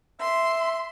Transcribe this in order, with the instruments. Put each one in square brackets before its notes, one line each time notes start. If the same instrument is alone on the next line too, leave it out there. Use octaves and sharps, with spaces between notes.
[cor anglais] E5 [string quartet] C6